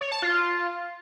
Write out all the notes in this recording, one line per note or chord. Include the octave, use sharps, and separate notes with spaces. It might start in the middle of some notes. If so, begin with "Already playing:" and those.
C#5
A5
F4